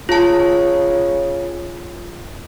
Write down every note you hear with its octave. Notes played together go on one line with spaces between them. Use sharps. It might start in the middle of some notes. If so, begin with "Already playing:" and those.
C#3 F4 A5